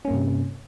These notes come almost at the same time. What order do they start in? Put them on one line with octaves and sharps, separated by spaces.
C#4 A#3 G2 C3